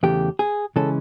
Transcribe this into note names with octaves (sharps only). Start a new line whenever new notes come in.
E2 C#3 E3 A3 G4
G#4
C#3 E3 G#3 C#4 A4